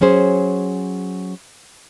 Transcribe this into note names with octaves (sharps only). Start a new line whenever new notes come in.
F#3 C#4 G#4 C5